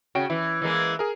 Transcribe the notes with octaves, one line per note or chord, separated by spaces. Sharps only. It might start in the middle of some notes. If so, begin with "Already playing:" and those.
C#3 F#4 G5 D7
E3 E4
E3 G#3 A#3
G#4 A#4